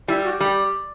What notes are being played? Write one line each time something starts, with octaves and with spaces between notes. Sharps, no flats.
G3 E4
F#4
G3 G4